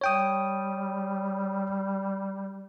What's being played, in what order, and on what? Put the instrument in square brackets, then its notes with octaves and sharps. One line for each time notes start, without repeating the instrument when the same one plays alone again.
[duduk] G3 [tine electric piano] C#5 G5 D#6